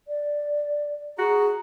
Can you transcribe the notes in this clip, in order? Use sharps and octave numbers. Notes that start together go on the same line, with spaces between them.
D5
F#4 G#4 A#5